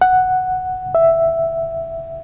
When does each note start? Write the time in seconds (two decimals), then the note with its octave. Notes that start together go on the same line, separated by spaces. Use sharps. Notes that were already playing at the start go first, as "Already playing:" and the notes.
0.01 F#5
0.95 E5